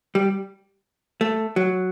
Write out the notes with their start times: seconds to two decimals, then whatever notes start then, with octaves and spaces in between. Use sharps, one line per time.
0.15 G3
1.21 A3
1.56 F#3